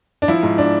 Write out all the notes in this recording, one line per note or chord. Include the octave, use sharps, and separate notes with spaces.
D4
F3 E4
G#2
D4